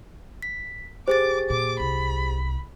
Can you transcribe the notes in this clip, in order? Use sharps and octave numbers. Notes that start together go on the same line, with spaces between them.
B6
G4 G#4 C5 D6 A6
A#2 D6
C2 B5